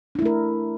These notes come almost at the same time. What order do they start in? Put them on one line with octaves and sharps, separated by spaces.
D4 E4 A3 A#4